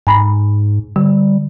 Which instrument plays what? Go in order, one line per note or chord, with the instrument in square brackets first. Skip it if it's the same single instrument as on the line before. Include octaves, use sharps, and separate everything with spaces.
[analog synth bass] G#2 [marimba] G#5 A#5 B5
[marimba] D3 [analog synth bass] G3